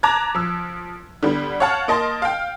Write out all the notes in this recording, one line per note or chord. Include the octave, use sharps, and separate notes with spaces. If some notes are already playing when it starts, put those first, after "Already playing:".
A5 A#5 D6 F#6 G#6
F3 E6
D3 G3 B3
C#5 F5 F#5 A5 F6
A#3 D#5 A5 C6
F5 G5